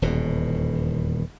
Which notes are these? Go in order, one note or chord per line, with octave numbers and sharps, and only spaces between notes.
D#1 E2 B2